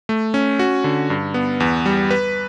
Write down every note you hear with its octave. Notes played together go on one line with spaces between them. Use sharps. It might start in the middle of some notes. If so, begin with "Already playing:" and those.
A3
C#4
F#4
D3
G2
B3
E2
G3
B4